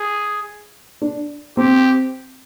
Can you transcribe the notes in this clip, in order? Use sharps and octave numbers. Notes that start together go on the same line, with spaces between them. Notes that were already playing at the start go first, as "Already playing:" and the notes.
Already playing: G#4
D4
C4 G4